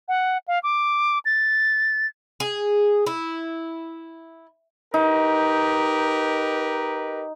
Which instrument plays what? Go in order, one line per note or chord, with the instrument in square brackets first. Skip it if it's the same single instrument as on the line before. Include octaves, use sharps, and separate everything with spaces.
[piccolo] F#5
F5
D6
A6
[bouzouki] G#4
E4
[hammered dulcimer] D#4 [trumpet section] G4 A#4 B4